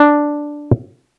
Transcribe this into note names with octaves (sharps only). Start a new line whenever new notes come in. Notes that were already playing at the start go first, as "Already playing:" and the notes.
Already playing: D4